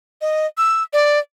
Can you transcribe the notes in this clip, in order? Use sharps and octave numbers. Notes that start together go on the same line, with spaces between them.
D#5
E6
D5